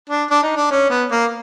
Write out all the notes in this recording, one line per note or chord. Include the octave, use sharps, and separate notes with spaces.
D4
D4
D#4
D4
C#4
B3
A#3